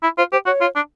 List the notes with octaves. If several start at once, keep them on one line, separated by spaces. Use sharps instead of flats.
E4
F4 C5
G4 C5
F#4 C#5
F4
D4